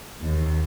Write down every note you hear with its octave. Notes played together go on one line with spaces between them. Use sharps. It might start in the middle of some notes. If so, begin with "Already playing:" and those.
D#2